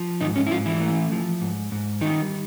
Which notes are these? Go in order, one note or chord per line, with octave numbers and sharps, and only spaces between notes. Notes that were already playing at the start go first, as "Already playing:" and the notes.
Already playing: F3
G#2 D#3 D#4
C#4
E4
G#2 F3 F4
E3 E4
A3
F3
G#2
G#2
D#3 G3 D#4